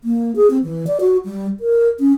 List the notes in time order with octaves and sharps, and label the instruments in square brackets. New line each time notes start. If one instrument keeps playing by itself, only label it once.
[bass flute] A#3
G#4
C4
E3
D5
F#4
G3
A#4
C#4